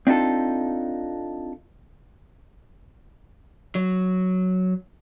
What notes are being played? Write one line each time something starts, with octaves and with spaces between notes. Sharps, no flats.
C4 D4 D#4 F4 A4
F#3